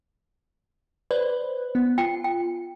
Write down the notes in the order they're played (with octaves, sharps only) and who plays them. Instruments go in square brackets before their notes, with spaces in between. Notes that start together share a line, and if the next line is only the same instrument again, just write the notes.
[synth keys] B4 C5 [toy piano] D5
[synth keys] B3
[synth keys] F4 [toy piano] G5
[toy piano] G5